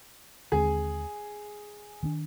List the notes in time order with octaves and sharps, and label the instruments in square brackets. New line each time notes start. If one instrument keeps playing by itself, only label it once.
[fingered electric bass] D#2 D3 G#3 C4 [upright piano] G#4
[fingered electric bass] D#3 A#3 D4